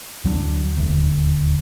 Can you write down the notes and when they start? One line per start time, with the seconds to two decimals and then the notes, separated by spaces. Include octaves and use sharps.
0.24 D2 F#3 G3 D4
0.77 D#1 D2